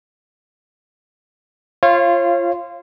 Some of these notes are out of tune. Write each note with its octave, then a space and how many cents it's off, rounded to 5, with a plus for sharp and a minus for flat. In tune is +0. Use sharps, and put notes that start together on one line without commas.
F4 -15 C#5 -35 F5 -25